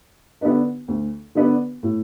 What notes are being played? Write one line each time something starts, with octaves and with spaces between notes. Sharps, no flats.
D3 B3 D4 B4
D2
D3 B3 D4 B4
A2